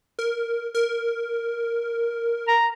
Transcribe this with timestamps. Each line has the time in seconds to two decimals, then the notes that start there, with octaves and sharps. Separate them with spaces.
0.19 A#4
0.75 A#4
2.48 A#5